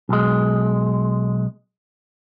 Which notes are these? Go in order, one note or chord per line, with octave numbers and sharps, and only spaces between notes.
B1 G#3